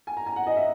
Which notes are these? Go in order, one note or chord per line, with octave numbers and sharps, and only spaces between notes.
G#5
A#5
G#5
F#5
D#5
E5